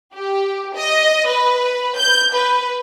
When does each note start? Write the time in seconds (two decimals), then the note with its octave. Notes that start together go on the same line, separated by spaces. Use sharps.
0.14 G4
0.77 D#5
1.28 B4
1.98 G6
2.35 B4